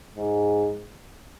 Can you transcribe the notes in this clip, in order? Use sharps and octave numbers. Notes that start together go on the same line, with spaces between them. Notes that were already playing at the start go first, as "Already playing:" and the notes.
G#2